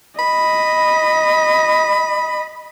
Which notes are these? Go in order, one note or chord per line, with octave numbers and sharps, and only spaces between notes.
D#5 B5